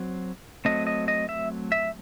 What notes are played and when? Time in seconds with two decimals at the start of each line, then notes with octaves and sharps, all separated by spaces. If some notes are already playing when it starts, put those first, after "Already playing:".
Already playing: F#3 C4
0.65 F#3 A3 C4 D#5
0.87 D#5
1.08 D#5
1.29 E5
1.72 E5